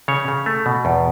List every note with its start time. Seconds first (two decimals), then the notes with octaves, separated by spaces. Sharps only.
0.08 C#3 C#5
0.28 C#3
0.46 A3
0.66 B2
0.85 E2